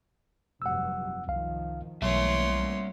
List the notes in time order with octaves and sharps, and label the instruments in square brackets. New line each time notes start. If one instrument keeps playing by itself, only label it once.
[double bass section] F1 G2 F#3 [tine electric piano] F#5 E6
[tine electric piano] C2 F5 [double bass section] D#3 F3
[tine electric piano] B1 [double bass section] E3 A3 A#3 [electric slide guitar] G3 E5 [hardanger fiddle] C#5 C6